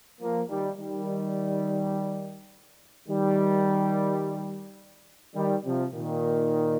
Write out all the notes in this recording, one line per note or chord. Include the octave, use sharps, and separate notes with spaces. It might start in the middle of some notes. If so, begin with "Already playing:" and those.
F3 A#3
D#3 G3
D#3 G3
D#3 G3
D#3 G3
C3 F3
A#2 D#3